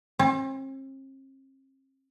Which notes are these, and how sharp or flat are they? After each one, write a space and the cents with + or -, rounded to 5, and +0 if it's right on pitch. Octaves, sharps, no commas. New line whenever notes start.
C4 +45